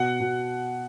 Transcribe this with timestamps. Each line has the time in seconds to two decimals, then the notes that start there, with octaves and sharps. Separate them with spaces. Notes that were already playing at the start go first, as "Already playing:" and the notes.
Already playing: B2 F#5
0.20 B2